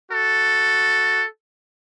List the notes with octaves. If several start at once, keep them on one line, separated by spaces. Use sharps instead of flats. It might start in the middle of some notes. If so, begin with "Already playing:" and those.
F#4 A4